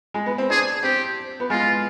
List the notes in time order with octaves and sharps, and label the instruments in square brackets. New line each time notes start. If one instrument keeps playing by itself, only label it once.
[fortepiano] G#3
B3
C4
[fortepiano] D4 [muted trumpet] G#4
[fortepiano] C4 [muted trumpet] G4
[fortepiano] B3
[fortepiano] G#3 [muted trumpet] F4